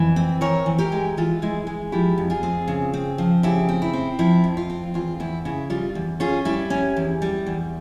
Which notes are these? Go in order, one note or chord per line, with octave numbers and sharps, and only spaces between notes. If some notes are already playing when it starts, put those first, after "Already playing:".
Already playing: F2 E3
C4
E3 A#4 C#5
E3
G4 A#4
G#3
E3 F4
G#3 E4
G#3
F3 E4 G4
F2
F4 G#4
C4
C#3
C4
F3
C#3 E4 G4
C4
E4
C4
F3 E4
F2
F4
C4
E2 F4
E2 E4
C#3 E4
G3 F4
E2
C#4 F4 G#4
G3 E4 G4
C#4
E2
G3
E2